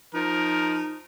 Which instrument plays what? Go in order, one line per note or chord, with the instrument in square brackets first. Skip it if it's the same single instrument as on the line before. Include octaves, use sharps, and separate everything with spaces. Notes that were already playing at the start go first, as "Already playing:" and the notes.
[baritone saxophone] F3 [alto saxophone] D#4 [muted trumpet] A#4